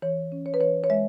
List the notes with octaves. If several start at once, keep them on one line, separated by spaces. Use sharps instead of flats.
E3 C#5
C#4
C#5
B4
E3 C#5
C#5
G#3 E5